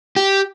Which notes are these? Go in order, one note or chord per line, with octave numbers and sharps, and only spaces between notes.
G4